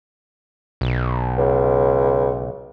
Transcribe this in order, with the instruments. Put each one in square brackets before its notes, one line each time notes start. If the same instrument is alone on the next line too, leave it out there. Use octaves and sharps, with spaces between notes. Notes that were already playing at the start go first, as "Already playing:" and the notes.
[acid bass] B1
[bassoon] C#2